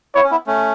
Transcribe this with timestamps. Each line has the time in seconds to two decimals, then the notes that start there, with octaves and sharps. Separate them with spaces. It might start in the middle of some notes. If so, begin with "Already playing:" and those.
0.15 B3 E4 C#5
0.23 C#4
0.31 B3 E4
0.47 A3 C#4